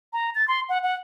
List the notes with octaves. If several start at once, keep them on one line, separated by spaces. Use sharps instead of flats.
A#5
A6
C6
F#5
F#5